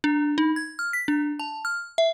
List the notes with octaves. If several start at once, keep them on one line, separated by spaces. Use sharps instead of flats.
D4
D#4
G#6
F6
B6
D4
A5
F6
E5